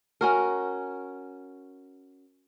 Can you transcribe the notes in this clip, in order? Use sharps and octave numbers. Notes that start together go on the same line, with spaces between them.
C#4 F#4 A#4